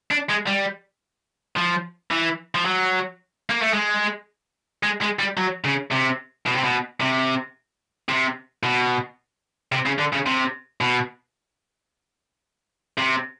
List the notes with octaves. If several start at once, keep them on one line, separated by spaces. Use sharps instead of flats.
D4
G#3
G3
F3
E3
F3
F#3
A#3
A3
G#3
G#3
G#3
G3
F#3
C#3
C3
B2
C3
B2
C3
C3
B2
C3
C#3
D3
C#3
C3
B2
C3